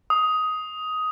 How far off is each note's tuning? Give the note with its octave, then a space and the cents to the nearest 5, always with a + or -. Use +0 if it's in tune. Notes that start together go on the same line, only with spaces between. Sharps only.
D#6 +10